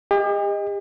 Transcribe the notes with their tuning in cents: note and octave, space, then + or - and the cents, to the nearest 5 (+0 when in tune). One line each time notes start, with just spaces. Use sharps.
G4 +45 D#5 +0